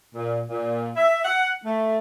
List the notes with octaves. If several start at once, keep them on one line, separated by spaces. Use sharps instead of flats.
A#2
A#2
E5
F#5
A3